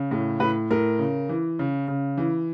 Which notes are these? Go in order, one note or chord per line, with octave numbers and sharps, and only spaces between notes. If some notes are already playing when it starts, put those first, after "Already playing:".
Already playing: C#3
A2
A2 B4
A2 A#4
C#3
E3
C#3
C#3
E3